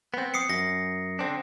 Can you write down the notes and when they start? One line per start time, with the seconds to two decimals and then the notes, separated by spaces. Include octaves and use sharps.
0.14 B3 C4
0.34 D#6 C7 C#7
0.50 F#2 A#6
1.19 D3 C4 D4